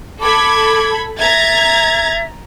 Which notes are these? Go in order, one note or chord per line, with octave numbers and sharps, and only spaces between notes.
A4 B5 D6 G#6
E5 A#5 G#6 A6